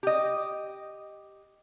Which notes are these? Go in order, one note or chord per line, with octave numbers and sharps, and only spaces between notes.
G4 D#5